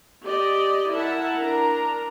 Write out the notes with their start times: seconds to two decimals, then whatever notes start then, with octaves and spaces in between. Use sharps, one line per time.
0.25 G4 D5 D#5
0.92 E4 A#4 E5 F#5 A5
1.38 D4 A#4 A#5